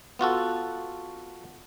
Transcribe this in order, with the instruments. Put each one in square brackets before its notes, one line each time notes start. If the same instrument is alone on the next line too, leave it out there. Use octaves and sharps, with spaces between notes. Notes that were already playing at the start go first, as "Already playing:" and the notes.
[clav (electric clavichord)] B3 F4 F#4 A4